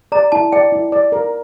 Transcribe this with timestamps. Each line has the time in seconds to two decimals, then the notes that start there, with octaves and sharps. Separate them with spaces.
0.12 D5 A#5
0.32 E4 A5
0.52 D5 G5
0.72 E4
0.92 D5
1.12 A#4